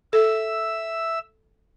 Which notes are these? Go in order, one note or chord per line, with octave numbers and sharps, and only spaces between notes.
A4 E5 E6